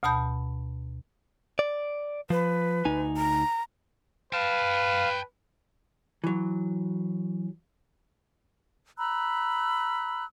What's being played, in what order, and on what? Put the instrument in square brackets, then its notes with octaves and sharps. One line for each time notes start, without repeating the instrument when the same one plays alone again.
[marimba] D2 B2 A5 B5 G6
[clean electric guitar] D5
[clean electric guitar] F3 [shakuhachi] B4
[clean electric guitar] D2 D#4 G#5
[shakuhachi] A#5
[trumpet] B4 [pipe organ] F5 [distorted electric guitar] G5 A5
[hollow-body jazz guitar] E3 F#3
[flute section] A#5 B5 E6 F#6